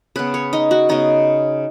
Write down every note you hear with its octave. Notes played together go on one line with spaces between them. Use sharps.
C#3 B3 B4
C#5
D#4
F#4
C#3 B3 D#4